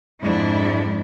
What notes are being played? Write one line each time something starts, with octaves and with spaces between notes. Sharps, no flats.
F2 G#2 G#3 C4 D4 E4